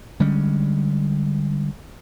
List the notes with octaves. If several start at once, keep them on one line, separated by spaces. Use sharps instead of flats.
D3 G3 G#3 C#4